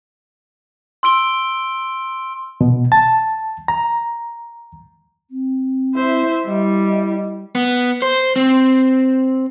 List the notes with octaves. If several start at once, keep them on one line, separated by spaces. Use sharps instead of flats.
C6 E6 D7 G7
B2
A5
A#5
C4
E4 C5 E5
G3 D#5
B3
C5
C4